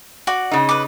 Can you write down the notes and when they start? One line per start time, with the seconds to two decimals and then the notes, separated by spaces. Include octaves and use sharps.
0.27 F#4 D5
0.51 C#3 D#4
0.69 B4 D6